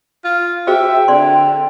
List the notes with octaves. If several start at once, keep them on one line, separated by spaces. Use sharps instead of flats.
F4
F#4 G#4 C5 E5 G5
D3 D5 C6